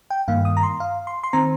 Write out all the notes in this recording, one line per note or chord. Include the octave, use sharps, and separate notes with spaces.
G5
G2 D#3 A#3 F5
D#6
A#5
C6
F5
C6
C6
D#3 C4 A#5